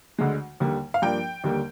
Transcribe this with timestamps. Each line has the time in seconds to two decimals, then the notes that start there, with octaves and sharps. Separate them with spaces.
0.19 D2 D3 G#3
0.60 D#2 D3 G3 A#3
0.94 F5
1.02 G2 F3 A#3 D4 G5
1.44 D#2 D3 G3 A#3